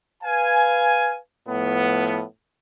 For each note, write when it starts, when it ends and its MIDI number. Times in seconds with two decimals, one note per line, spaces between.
0.22 1.18 71
0.22 1.18 77
0.22 1.18 80
1.49 2.23 45
1.49 2.23 53
1.49 2.23 59